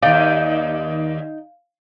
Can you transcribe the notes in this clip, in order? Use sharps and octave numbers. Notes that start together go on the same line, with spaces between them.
D#2 D#4 D5 F5 G5